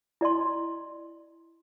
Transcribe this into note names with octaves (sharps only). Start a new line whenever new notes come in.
E4 D5 D#5 C6